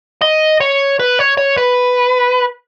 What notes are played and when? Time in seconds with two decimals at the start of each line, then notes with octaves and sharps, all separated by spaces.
0.21 D#5
0.60 C#5
1.00 B4
1.19 C#5
1.37 C#5
1.57 B4